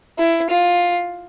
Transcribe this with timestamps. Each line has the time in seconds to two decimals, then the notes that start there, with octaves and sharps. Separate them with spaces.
0.18 E4
0.50 F4